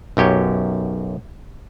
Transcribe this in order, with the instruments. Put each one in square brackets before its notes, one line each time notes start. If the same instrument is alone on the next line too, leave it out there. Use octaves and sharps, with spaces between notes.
[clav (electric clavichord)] B1 F#2 G4 C#5